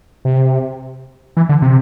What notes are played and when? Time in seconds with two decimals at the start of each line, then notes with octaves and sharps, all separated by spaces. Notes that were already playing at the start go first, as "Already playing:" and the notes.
0.25 C3
1.37 E3
1.49 D3
1.62 C3